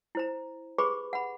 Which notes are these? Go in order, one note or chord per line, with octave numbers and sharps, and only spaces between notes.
E4 C5 A#5
G4 G#4 B4 B5 C#6 D6
F#5 B5